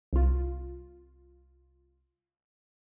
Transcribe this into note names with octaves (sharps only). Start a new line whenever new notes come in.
C2 F4